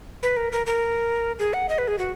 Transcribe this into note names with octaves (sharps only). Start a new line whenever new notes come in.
B4
A#4
A#4
A#4
G#4
F#5
D#5
B4
G#4
F#4